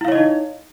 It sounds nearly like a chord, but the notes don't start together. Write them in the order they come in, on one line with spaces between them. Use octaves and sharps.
E4 F5 C#5 D#5 D#4